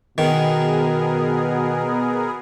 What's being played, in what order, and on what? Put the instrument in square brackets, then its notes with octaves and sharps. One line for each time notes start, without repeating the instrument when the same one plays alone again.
[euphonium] B2 [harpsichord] D#3 [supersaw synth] B3 G#4 A#4